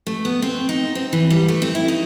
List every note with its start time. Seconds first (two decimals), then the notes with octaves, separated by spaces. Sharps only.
0.07 A3
0.25 B3
0.42 C4
0.69 D#4
0.95 C4
1.13 E3
1.30 G3
1.48 A3
1.62 C4
1.75 E4
1.88 D#4